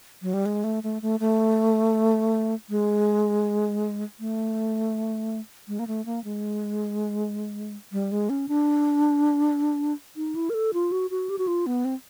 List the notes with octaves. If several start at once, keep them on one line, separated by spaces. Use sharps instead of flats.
F#3
G3
G#3
A3
A3
A3
A3
G#3
A3
G#3
A#3
A3
A#3
G#3
G3
G#3
C#4
D4
D#4
E4
A#4
A4
F4
F#4
F#4
G4
F#4
F4
B3
C4